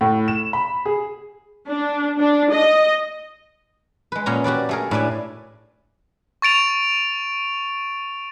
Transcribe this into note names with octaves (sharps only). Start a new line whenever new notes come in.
A2
E7
B5
G#4
D4
D4
D#5
G#3 B4
A#2 B3 C#4 G#5 A#5
F#4 G4 B4 D5
A3 G#4 A#4
A2 D4 B4 D5 G#5
C#6 A6 D7 F7